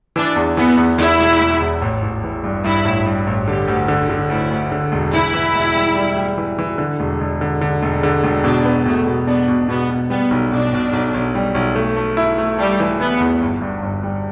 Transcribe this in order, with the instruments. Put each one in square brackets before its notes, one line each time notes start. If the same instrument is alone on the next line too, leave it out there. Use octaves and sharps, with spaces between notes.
[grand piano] E3 [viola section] D4
[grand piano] E2
[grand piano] E3 [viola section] B3
[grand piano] E2
[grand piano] E2 [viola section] E4
[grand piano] E1
E1
E2
A1
A1
E3
G2
[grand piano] G2 [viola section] E4
[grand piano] A1
G2
A1
[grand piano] D3 [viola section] G4
[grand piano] D2
D3
D3
[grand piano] D2 [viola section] E4
[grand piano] D2
D3
E1
[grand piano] E3 [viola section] E4
[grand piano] E3
E1
G3
G3
G3
E3
E3
D3
E1
E1
D3
D3
E1
D3
E1
[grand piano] B2 [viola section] D4
[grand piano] B3
[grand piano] B2 [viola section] A3
[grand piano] B2
[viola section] B3 [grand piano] D4
[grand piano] B2
[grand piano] B2 [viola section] B3
[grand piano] B2
[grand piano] G3 [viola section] B3
[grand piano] B1
[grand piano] B2 [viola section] D4
[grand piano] B2
B1
B1
G3
B1
A3
A3
E4
A3
[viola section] G3 [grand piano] A3
[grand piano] E3
[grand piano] E3 [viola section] B3
[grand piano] E2
G1
G2
G1
G3